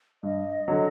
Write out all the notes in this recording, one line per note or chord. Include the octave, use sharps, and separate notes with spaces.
G2 D#5
D3 F#3